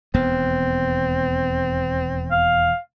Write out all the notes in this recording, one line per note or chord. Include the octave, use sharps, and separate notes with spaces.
E1 D#2 B3 C4
F5